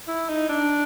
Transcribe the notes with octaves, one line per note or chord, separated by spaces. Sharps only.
E4
D#4
D4